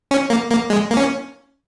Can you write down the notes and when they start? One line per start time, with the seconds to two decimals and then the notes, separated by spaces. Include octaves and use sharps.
0.11 C#4
0.30 A#3
0.51 A#3
0.70 G#3
0.91 A#3
0.97 C#4